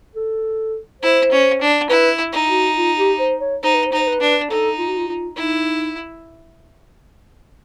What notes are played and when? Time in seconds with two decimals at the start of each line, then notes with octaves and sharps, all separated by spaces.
0.15 A4
1.02 E4 C5
1.31 C#4
1.61 D4
1.90 E4 B4
2.33 D#4
2.48 F#4
2.76 F4
2.98 G4
3.19 C5
3.41 C#5
3.63 D#4 C5
3.74 B4
3.86 C5
3.92 D#4
3.99 C5
4.07 B4
4.21 D4
4.50 D#4 A4
4.78 F4
4.88 F#4
4.98 F4
5.08 F4
5.36 D#4 E4